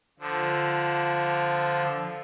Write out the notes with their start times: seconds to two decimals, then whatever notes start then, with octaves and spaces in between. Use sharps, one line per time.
0.19 D3 F3